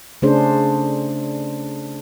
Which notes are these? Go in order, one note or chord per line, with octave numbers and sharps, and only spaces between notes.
C#3 A3 C#4 D4 G#4 C5